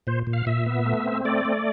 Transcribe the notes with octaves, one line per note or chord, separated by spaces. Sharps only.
A#2 C5
A#2
F5
A#2 E5
B3
A3
C4
A3 D5
A3